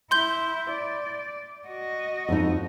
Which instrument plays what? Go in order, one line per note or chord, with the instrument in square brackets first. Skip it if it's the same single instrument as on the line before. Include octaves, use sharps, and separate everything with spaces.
[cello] E4 [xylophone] C6 G6 G7
[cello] D5
F#4 D#5
[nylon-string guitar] F2 D#4